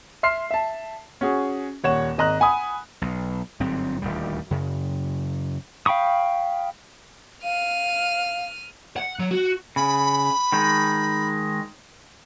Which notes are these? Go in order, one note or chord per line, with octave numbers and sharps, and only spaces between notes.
E5 C6 F6 C7
E5 A5
C#4 F#4 G#4
D#1 C#5 F#5 E7
G#1 D#5 A#5 F#6
F#5 G#5 B5 D#6
B1
G1 G#2 F#3 C4
D#1 D2 G3
F#2 C#3
F5 G5 B5 C#6 D#6
F5 F6 D#7
F#5
F#3
F#4
C#3 B5
D#3 G#3 D#4